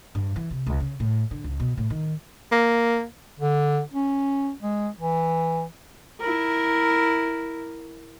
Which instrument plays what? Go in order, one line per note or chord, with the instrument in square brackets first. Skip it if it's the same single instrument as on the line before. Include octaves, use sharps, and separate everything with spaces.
[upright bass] G2
E3
C3
C#2
C#3
A2
D3
C#2
B2
A2
D#3
[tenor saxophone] A#3
[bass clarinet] D3
C#4
G#3
E3
[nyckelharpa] E4 A#4